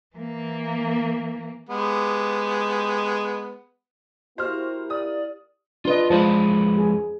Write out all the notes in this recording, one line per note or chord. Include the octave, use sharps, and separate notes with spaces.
E3 A#3
G#3 B3 G4
A#3 E4 F#4 G4 C5 F6
D5 D#6
D4 F4 B4 D#5 C6
F2 G#3 F4 B4 C5 A5
G#4